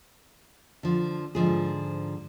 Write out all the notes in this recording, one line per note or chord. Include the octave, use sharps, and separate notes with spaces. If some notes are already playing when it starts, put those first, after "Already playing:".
D3 F3
G#2 D3 F3 G#4